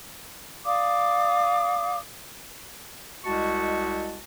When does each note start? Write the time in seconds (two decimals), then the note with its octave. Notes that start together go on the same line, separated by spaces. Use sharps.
0.65 D5 F5 D6 D#6
3.25 C2 G#3 F#4 D#5 A5 C#6